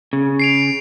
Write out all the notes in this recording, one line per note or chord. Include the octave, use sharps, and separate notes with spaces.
C#3
C7 D7 F7